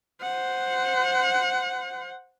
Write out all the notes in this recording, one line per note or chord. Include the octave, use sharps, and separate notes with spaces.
C5 F#5